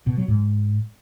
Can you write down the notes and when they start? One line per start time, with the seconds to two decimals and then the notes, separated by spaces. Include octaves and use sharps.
0.07 B2
0.17 F#3
0.28 G#2